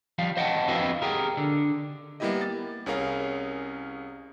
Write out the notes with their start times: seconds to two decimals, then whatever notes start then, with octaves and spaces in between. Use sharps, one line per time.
0.18 F3 G3 F5
0.37 C5 D#5 F#5 G5 A5
0.68 F2 E4 F#4 B4 D#5 F5
1.02 G4 G#4 A#4
1.37 D3
2.20 G3 A#3 B3 E4 G4 D#5
2.41 A6
2.86 C2 C#4 G#4 A#4 F5